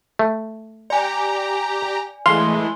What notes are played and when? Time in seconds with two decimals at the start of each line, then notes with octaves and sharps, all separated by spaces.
0.19 A3
0.90 G4 D5 G#5 A#5
2.26 E3 G#3 A3 F5 C6